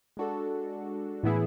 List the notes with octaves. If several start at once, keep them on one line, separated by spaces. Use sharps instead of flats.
G#3 D4 F#4 A4
A2 E3 B3 E4 G#4